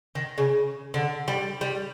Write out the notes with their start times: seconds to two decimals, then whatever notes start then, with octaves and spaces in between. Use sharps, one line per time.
0.15 D#3
0.38 C#3
0.94 D3
1.28 G3
1.61 G3